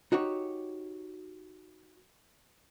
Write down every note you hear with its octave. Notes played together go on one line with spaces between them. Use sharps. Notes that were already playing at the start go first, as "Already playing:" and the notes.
D#4 F#4 G4 C#5